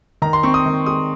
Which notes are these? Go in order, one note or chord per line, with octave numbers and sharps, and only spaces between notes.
D#3 A#5
C6
C4 C#6
D#6
D#3
G#3 D#6